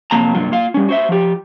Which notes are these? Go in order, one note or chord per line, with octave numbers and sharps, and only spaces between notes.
F2 C3 F#3 A#3 A5 A#5
G2 C3 F#3 A#3 F4
A#3 F4 F5
G3 C#4
F#4 C5 E5
F3 G4